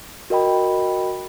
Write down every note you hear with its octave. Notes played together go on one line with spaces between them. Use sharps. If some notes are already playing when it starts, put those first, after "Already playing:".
F#4 A#4 D#5 G5 B5